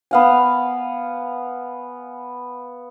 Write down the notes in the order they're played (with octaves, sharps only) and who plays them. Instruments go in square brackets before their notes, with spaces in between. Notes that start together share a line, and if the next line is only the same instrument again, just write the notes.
[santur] B3 F5 G#5